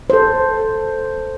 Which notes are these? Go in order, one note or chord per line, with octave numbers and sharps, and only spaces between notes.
A4 C5